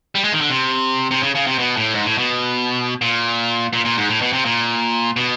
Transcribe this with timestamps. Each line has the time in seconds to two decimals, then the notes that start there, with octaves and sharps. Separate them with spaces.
0.15 G3
0.24 G#3
0.33 D#3
0.41 D3
0.50 C3
1.11 C3
1.23 C#3
1.35 C#3
1.47 C3
1.59 B2
1.77 A2
1.93 G#2
2.05 A2
2.18 B2
3.02 A#2
3.73 A#2
3.85 A#2
3.97 G#2
4.09 A2
4.21 B2
4.33 C3
4.45 A#2
5.16 B2